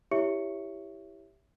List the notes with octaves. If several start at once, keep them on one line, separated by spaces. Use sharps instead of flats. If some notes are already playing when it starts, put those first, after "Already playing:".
E4 G4 C#5 E5 C#6 C#7